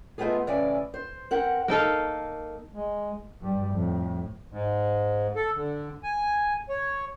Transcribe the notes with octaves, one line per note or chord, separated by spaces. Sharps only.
G#3 A3 B3 F4 G#4
A2 C#3 E3 D5 E5 G#5
C5
C4 A#4 F#5
A#3 D#4 A4 F5
G#3
G2 G3
F2 A2
G#2
A4
D3
G#5
C#5